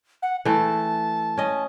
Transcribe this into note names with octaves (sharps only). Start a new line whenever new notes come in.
F#5
E3 A3 A5
C#4 D#5